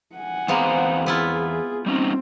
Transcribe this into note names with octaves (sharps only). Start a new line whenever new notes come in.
F#5 G#5
E2 G#3 B3 C4 F5 A#5
B3 E4 F4 G#4
G3 C4 C#4 D#4